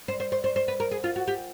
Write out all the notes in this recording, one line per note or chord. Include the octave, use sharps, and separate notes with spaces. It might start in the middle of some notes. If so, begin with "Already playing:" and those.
C5
C5
C5
C5
C5
B4
A#4
G#4
F4
F#4
G4